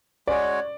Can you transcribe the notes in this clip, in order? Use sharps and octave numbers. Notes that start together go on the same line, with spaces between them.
G#3 C#4 F#4 C#5 D5